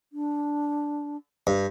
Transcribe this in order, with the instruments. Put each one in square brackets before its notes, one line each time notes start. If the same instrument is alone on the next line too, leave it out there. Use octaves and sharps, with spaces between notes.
[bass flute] D4
[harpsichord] G2